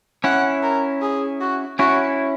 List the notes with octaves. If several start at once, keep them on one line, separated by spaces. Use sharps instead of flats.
C#4 E4 F#5
A#4
G#4
F#4
C#4 E4 F#4